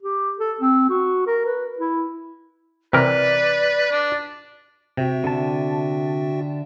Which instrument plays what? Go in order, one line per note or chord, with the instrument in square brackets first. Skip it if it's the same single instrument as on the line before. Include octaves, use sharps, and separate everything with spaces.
[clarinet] G4
A4
C4
F#4
A#4
B4
E4
[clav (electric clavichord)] C3 E3 A#4 [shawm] B4 [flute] D5
[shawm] D4
[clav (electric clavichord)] C3 [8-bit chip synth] F#4 E5 G5
[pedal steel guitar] D3 A5